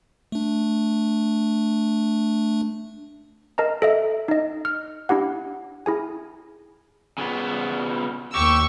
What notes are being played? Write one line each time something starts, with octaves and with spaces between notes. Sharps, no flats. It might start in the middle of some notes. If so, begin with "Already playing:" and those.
A3 D4
A#4 D#5 A5 A#5
A4 D#5 E5
D#4 D#5
F6
D4 E4 G4 F#5
E4 G#4 G#5
C#3 B3
D#2 G4 C#6 E6